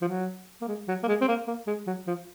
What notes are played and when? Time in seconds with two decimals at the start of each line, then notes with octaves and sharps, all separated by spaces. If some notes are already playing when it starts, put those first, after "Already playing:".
0.02 F3
0.08 F#3
0.62 A#3
0.68 G#3
0.88 F#3
1.03 A#3
1.08 G#3
1.21 C4
1.28 A#3
1.48 A#3
1.67 G#3
1.87 F#3
2.08 F3